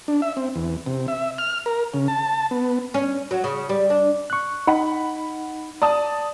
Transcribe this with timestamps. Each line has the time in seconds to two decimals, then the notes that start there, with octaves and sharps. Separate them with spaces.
0.08 D4
0.22 E5
0.37 C4
0.56 E2
0.86 C3
1.08 E5
1.38 F6
1.66 A#4
1.94 C#3
2.08 A5
2.51 B3
2.94 C#4
3.31 F#3
3.44 C#3
3.69 G3
3.90 D4
4.30 C#6 F#6
4.67 D#4 F#5 B5
5.82 D5 A5 D#6